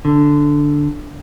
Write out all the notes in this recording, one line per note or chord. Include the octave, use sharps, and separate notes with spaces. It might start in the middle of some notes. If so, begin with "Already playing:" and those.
D3